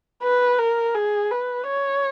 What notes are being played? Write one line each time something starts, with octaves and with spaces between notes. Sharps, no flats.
B4
A#4
G#4
B4
C#5